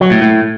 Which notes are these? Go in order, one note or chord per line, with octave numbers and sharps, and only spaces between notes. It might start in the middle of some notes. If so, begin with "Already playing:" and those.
F#3
A2
A2